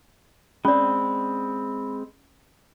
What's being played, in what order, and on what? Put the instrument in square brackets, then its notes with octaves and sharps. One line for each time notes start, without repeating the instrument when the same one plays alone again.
[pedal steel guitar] G#3 C4 [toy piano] C#4 D5 [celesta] B5